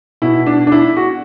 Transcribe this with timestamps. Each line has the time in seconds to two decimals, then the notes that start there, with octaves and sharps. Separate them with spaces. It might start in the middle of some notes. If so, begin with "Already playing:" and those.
0.22 B2 E4
0.46 D4
0.67 D4
0.72 E4
0.96 F#4